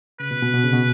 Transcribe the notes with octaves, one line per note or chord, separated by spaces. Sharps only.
C#3 B4
B2
B2
B2
C#3
B2